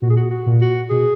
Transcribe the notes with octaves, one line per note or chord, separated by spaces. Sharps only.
A#2 F#4
G#4
F#4
F#4
A#2
F#4
B2 G#4